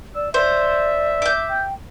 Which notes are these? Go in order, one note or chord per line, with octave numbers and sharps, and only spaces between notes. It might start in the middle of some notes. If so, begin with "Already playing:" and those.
D5 E6
C5 D5 E5
D6 G6
G5